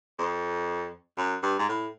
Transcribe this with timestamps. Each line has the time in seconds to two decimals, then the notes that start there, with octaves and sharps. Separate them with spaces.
0.19 F2
1.18 F#2
1.43 G2
1.59 G#2
1.69 A2